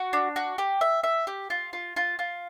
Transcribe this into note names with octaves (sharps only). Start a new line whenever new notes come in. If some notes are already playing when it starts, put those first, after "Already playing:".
Already playing: F#4
D4
F#4
G4
E5
E5
G4
F4
F4
F4
F4